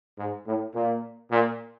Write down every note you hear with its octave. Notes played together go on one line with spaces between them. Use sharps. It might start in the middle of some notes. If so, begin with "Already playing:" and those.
G#2
A2
A#2
A#2